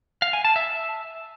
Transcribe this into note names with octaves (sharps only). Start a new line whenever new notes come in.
F5
G#5
A5
E5